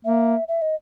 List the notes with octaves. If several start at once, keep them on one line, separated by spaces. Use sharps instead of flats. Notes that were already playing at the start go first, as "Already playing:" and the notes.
A#3 E5
E5
D#5